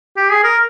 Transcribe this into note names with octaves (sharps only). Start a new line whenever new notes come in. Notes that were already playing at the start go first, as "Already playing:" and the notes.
G4
G#4
A#4